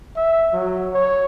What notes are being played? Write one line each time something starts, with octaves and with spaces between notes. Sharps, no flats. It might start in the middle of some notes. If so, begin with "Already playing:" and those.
E5
F#3
C#5